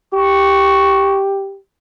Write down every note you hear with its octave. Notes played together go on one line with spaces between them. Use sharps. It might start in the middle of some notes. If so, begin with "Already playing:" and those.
G4 C#6